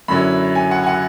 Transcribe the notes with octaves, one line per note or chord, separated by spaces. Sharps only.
F#2 D3 F#3 C#4 E4 B5
G#5
F#5
G#5
F#5